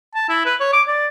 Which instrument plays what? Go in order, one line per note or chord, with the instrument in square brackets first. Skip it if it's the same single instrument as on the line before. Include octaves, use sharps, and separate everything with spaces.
[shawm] A5
E4
B4
C#5
D6
D5